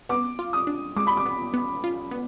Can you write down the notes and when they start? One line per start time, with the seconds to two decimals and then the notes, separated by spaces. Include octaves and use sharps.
0.09 B3 D6
0.39 F4
0.53 D#6
0.67 D4
0.96 G#3 D6
1.07 B5
1.17 D6
1.26 B3
1.54 B3
1.84 F4
2.11 B3